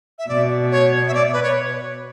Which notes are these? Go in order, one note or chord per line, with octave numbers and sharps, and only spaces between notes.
E5
B2 D5
C#5
E5
D5
B4
C#5